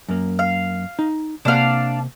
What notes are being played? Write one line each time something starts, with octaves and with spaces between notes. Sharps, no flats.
F#2 A#3
F5
D#4
C3 A#3 D4 F5 F#5